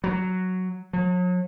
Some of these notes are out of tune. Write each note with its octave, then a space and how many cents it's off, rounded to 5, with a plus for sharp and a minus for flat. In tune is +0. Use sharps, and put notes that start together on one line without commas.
F#3 +0
F#3 -40